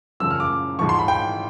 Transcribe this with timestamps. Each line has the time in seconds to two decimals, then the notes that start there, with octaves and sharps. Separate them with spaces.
0.20 F#2 C#3 F3 E6
0.30 F6
0.40 D6
0.79 G#2 F3 C#6
0.89 C6
0.99 B5
1.08 G5